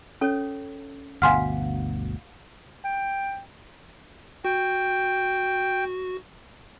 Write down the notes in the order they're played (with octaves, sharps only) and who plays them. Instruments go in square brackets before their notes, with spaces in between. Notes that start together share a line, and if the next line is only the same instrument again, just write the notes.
[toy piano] C#4 A4 C#5
[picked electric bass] G1 D2 B2 [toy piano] F5 F#5 [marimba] G#5 C6 F6
[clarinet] G5
[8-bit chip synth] F#4 [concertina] G5